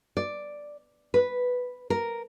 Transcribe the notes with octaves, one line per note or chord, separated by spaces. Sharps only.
D5
B4
A#4